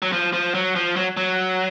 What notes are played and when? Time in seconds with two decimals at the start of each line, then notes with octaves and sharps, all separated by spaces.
0.02 F#3
0.12 F3
0.33 F3
0.54 F#3
0.75 F3
0.96 F#3
1.17 F#3